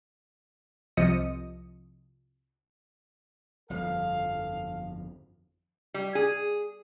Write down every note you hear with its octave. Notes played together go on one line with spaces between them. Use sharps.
C2 C3 F3 D#5 D#6 C#7
G1 F2 F3 A4 F5
G3
G#4